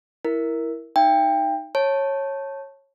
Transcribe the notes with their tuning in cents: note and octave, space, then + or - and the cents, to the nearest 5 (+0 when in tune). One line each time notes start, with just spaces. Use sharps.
E4 +0 A#4 +0
D#4 +0 E5 +45 G5 +20
C#5 -15 A5 +0